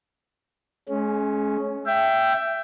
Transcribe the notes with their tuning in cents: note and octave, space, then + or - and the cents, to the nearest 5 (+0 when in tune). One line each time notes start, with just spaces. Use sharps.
G#3 +35 C#4 +0
E5 +15 G5 -5